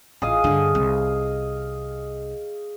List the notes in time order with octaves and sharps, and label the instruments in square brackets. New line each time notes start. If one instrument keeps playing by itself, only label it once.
[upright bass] A1 [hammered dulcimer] G#4 D#5 F5
[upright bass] G2 D3
C2